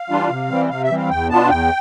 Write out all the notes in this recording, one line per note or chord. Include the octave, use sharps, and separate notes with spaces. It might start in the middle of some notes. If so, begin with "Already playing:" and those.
Already playing: F5
E3 G3 D4 F4
C3
E3 G3 C4
C3 F5
E5
E3 G3 C4
F5
E2 G5
B2 B3 D4 F4 A5
E2 G5